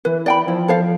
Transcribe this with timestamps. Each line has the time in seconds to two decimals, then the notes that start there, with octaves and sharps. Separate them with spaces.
0.05 E3 B4
0.26 D5 G5 B5
0.47 F3 E4
0.68 A4 C5 F5